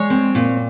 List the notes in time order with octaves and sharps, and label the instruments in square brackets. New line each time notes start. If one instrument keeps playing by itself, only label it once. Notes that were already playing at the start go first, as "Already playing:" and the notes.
Already playing: [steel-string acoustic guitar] G#3 C#5
C4
A#2